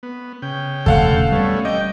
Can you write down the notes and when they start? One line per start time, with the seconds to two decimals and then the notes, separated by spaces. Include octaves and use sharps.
0.03 B3
0.42 C#3 G5
0.86 E1 D3 A3 A4 F5 F#5
1.32 G3 A3 B3 C#4
1.65 D#5 G5 D6